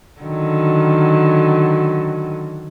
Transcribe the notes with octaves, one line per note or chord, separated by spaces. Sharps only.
D3 D#3 F#3